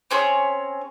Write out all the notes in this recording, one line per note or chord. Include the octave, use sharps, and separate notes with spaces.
C4 C#4 G#4 C#5